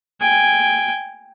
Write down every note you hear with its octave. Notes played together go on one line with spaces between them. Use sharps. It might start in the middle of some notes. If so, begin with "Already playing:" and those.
G5 G#5